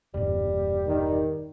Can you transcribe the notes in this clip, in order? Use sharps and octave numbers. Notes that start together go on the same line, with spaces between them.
E1 G2 A#2 G3
D#3